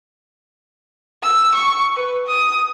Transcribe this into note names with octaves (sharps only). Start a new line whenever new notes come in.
E6
C#6
B4
D#6